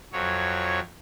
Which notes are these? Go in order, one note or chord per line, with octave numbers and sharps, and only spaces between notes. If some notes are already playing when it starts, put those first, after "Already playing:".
F2 F#3 C#5